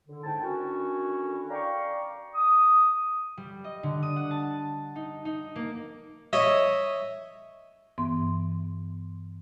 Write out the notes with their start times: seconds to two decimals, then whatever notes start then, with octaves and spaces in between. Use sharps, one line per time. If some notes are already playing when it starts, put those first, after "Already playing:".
0.07 D3
0.23 G#2 E4 G5 A5
0.40 D3 D#3 C#4 E4 F#4
1.49 D5 F5 G5 A#5 C#6
2.34 D#6
3.37 G3
3.64 D#5
3.83 D3
4.03 D#6
4.16 F#5
4.31 A5
4.96 D#4
5.25 D#4
5.56 A#3
6.33 C#5 D#5 E5
7.98 G2 E3 B3 C6